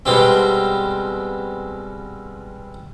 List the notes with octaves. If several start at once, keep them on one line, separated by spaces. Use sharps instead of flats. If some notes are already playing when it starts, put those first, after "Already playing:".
B2 G3 G#3 C4